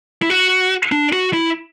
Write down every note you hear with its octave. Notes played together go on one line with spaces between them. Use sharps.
E4
F#4
D4
F#4
E4